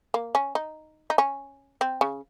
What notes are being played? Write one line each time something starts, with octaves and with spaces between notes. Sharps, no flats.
A#3
C#4
D#4
D#4
C#4
C4
C#3